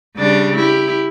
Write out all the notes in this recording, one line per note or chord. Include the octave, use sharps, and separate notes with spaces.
C#3 G3 D4
E4 G4